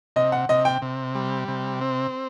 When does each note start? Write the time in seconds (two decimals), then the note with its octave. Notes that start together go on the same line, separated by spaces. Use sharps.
0.16 C3 D#5
0.32 F#5
0.49 C3 D#5
0.65 G5
0.82 C3
1.15 G3
1.48 C3
1.81 C4